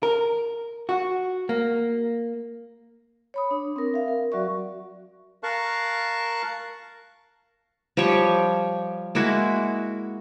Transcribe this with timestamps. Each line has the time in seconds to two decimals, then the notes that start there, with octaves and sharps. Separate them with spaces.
0.03 A#4
0.89 F#4
1.49 A#3
3.34 C#5 B5 D#6
3.51 D4
3.76 C4 A#4
3.94 E5 F5
4.08 A#4
4.32 F#3 F#4 D5 E5 C#6
5.43 A#4 F5 A5 C#6 F#6
7.97 F3 G3 G4 C#5
9.15 G#3 A#3 E4 F#4